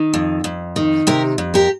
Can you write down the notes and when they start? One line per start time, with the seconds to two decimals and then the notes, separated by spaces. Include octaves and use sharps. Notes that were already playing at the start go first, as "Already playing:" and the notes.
Already playing: D#3
0.14 F2
0.44 F2
0.76 D#3
1.07 C3 G4 A#4
1.38 F2
1.54 G4 A#4